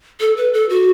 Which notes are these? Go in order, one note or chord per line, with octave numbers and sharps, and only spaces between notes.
A4
B4
A4
F#4